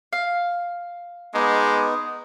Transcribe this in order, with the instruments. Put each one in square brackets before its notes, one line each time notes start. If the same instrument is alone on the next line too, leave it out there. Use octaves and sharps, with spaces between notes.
[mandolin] F5
[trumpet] G#3 [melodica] B3 D#4 [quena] D6
[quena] D#6